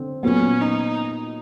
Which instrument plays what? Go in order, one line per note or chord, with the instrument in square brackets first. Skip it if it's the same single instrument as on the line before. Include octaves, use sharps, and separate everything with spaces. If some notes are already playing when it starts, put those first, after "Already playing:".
Already playing: [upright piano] D3 C4
[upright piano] A#2 F#3 B3 [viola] C#4
[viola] D#4